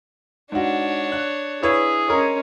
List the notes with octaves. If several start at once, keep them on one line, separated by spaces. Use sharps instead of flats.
G#2 D4 F#4 C#5
F#6
E4 G#4 B4 C#5
G#3 C#4 A#4 C#5